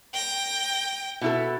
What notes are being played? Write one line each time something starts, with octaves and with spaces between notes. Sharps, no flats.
G5 A#6
B2 E4 A4